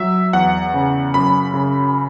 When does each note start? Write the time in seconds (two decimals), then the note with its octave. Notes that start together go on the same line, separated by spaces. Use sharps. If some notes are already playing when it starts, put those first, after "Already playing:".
Already playing: F#3 E5
0.33 E2 F#5
0.74 C#3
1.14 F#2 B5
1.54 C#3